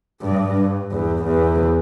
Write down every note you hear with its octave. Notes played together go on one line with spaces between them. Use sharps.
G2
E2
E2